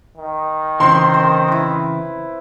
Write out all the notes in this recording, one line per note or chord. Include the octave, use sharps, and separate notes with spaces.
D#3
C#3 E3 A#3 C4 C6
C5
E4 B4